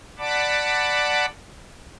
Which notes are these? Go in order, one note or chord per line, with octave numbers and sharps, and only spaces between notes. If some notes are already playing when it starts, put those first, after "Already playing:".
D5 F#5 A5 B5 D6